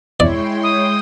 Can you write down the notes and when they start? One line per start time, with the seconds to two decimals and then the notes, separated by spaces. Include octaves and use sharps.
0.20 G#3 E4 C#5 D5 G5 C6
0.63 D#6